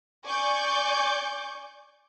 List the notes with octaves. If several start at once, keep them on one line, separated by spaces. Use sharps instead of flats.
D5 G#5 C#6 D6 G6